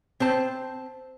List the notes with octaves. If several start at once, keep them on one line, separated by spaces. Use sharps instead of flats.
C4 C5 A5